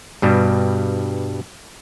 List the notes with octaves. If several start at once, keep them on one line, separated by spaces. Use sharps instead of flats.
G2 B2 G3